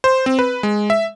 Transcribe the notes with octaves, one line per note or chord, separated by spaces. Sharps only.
C5
C4
B4
G#3
E5